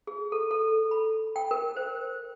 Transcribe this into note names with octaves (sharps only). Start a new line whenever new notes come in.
G#4
A4
A4
B5
G5
A#4
C5